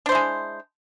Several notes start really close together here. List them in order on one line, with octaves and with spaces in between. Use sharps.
D4 C5 E4 G#3